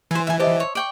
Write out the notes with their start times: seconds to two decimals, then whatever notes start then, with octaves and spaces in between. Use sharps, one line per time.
0.11 E3 C5 G#5
0.27 E5 G#5
0.40 G4 C5 D#5 E5 A5
0.60 C#5
0.75 D5 G5 C#6